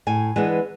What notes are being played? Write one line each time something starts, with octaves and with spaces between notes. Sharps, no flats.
A2 G#5
E3 G#3 B3 D4